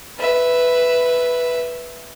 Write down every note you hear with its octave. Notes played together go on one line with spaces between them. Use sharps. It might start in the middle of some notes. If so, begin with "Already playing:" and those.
B4 E5